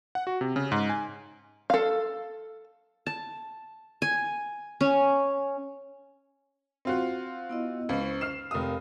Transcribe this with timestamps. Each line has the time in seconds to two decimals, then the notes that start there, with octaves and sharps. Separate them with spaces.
0.15 F#5
0.27 F#4
0.41 C3
0.56 C#3
0.72 G#2
0.89 G#5
1.70 A4 F5
3.07 A5
4.02 G#5
4.81 C#4
6.85 C4 F4 F#4
7.49 B3 E4 D#5
7.89 C#2 C#4 C5
8.21 F6 C7 E7
8.51 F1 A#4 F5 D#6